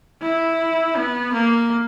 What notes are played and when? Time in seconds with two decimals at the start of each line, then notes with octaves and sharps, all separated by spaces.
0.22 E4
0.96 B3
1.33 A#3